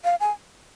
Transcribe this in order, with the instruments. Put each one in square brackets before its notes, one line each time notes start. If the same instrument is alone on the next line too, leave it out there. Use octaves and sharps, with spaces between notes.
[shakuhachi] F5
G#5